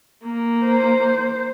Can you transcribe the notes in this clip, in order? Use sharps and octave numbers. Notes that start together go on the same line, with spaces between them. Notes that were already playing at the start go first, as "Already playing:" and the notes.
A#3
C5